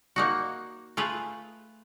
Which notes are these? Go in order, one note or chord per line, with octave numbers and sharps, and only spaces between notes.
A#3 D#4 F#4
A3 F4 G#4 B4